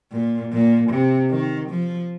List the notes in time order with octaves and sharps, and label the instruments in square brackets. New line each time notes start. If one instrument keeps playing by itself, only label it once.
[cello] A#2
A#2
C3
D#3
F3